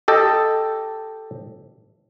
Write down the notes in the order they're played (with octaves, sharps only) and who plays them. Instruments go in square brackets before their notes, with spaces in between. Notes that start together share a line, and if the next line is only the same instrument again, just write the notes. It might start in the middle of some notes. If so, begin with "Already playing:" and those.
[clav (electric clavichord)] G4 A4 D#5 G5